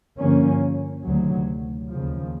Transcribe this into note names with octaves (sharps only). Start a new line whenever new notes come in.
G2 D3 F3 A#3 C#4
D2 C3 D#3 F#3
D#2 C#3 F3